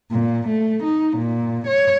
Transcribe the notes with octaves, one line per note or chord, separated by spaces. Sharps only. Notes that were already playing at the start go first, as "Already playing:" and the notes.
A#2
A3
D#4
A#2
C#5